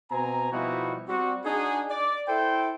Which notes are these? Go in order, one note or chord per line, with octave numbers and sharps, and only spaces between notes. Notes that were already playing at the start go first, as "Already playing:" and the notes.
B2 C4 G#5 A#5
B2 F3 G3 D#4 E4 F#4
G3 C4 F#4
D4 D#4 F#4 G#4
D5
E4 A4 C5 G5